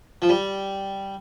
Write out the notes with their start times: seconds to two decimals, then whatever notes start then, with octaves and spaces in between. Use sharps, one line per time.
0.22 F3
0.29 G3